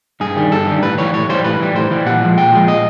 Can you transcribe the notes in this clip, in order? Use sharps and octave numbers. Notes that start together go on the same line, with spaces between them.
G2 G#4
D#3 G3
G2 A4
D#3 G3
A2 B4
E3 G3 C#5
A2 C#5
E3 G3 C5
A2 B4
E3 G3
A2 C5
E3 G3
A#2 F#5
F3 G#3
A#2 G5
F3 G#3
A#2 D#5